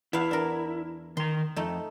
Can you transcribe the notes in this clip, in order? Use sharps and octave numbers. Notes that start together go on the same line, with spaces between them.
E2 B3 E4 F5
D4 A#4
D#3 A#5 C6
F2 A3 D#4